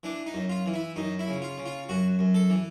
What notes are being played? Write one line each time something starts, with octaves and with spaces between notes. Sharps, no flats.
E3 D4
D#4
F#2
F4
E3
E4
F#2 D#4
E4
C#3
F4
C#3
F4
F#2 F#4
F#2
A4
E3